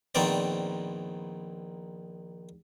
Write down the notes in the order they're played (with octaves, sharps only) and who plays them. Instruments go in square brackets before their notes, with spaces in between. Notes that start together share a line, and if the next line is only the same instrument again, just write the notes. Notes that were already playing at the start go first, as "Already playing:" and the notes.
[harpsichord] A#1 A#2 D#3 B3 C4 D5